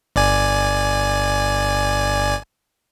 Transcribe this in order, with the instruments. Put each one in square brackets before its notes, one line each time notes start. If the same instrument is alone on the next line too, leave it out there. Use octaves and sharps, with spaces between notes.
[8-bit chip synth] G1 D5 G#5